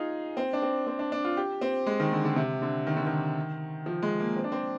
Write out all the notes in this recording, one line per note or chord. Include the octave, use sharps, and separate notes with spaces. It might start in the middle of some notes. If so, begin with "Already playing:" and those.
Already playing: D#4 F4 G#4
C4
D4
C4
C4
D4
D4
F4
G4
C4
G#3
D#3
D3
D3
C3
D3
D#3
D3
D#3
F3
G#3
A#3
C4
D4
C4